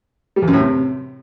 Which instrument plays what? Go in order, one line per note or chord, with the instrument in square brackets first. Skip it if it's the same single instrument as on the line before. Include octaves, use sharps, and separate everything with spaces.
[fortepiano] G3
E2
F#2
A2
C3